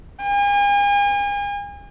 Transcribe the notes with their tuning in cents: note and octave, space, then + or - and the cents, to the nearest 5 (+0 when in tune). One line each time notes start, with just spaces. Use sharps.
G#5 -40